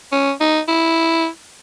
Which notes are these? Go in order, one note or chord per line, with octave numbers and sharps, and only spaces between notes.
C#4
D#4
E4